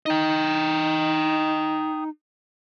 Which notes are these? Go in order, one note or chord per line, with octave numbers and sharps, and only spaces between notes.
D#4 D#5 G5